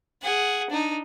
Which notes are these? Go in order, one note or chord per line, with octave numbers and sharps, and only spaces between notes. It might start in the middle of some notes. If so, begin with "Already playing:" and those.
G#4 F#5
D4 D#4